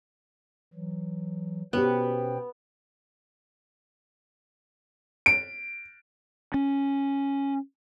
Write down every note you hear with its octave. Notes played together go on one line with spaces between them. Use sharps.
E3 F#3
B2 B3 C#4 F#4 G4 C5 G5
D7
C#4